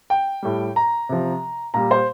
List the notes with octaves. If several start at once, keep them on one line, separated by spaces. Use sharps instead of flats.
G5
A2 G3
A#5
C3 F3
A#2 G3 A#5
C5